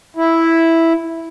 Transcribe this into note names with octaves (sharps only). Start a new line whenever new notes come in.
E4